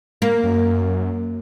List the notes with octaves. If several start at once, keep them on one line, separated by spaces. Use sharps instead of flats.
A#3
F#2